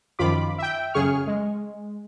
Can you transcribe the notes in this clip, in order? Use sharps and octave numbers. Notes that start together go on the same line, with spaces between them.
F#2 D#3 F3 F4 B5 D6
E5 G5
F#2 C#3 G#4 C#6 F6
G#3